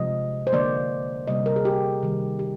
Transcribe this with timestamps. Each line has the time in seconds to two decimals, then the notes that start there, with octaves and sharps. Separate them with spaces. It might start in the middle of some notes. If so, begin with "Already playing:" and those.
Already playing: C3 F3 G#3 D#5
0.47 C5
0.53 D3 F3 A#3 D5
1.27 C3 G3 A#3 D#5
1.46 A#4
1.56 G#4
1.65 G4
2.03 C3 D#3 G3
2.39 G4